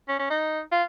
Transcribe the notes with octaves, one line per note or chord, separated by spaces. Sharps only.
C#4
C#4
D#4
F4